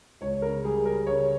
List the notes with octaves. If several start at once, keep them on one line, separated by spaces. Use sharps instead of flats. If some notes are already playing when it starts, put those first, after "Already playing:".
C#2 C#5
C#3 A#4
G3 G#4
G3 A#4
C#3 C#5